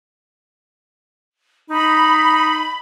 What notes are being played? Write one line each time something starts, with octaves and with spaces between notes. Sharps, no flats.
D#4 B5